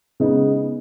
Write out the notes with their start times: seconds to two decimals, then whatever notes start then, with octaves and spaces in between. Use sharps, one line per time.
0.20 C#3 G#3 B3 D#4